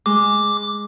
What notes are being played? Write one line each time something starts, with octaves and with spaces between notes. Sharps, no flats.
G#3 D6